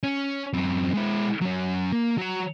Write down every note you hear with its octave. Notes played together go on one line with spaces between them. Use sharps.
C#4
F#2 C4
G#3 E4
F#3 C#4
A#3
F#3 A#5